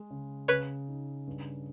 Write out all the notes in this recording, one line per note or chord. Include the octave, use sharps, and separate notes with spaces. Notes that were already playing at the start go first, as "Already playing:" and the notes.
Already playing: G#3
C#3
C#3 B4 C#5
D#4
G2